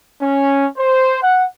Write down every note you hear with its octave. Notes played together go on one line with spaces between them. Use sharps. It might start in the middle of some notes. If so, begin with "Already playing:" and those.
C#4
C5
F#5